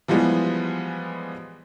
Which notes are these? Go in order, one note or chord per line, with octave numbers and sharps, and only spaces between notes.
E3 F3 G3 G#3 B3